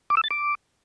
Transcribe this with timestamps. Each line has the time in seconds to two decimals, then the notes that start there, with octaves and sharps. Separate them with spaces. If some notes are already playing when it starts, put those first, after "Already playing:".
0.10 D6
0.17 E6
0.24 A6
0.31 D6